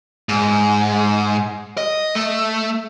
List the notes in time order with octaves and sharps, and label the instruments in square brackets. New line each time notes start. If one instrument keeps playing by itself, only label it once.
[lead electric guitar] G#2
D#5
A3